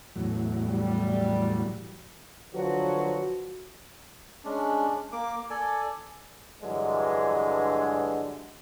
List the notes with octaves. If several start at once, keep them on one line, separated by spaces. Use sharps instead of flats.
E2 A2 F#3
G3
D3 F3 F#3 F#4 B4
G#3 C#4 D4
A#3 D6
A4 D5 G#5
G2 D3 E3 F#3 G#3